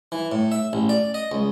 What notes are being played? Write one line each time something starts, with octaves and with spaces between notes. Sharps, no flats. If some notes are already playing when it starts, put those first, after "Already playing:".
E3
A2
E5
A1
D5
D#5
C#2